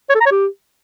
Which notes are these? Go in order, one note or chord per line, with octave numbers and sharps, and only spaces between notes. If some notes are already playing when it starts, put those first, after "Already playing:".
C#5
A4
A#5
C#5
G4